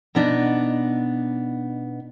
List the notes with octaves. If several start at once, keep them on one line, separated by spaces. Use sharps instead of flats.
B2 B3 D4 D#4